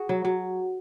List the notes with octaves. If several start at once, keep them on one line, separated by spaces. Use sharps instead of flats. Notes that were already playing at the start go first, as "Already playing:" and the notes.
Already playing: F#4 G#4
F#3
F#3